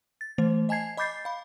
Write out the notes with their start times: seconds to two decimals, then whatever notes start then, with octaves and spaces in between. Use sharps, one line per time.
0.21 A6
0.38 E3 A3 C5
0.69 D#5 G#5 A5 G#6 C7
0.97 D#5 B5 D6 G6 A6 C7
1.25 F5 B5